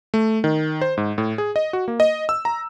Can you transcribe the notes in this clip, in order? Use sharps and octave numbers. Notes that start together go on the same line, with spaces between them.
A3
D#3
C5
G#2
A2
G#4
D#5
F#4
A#3
D#5
E6
A#5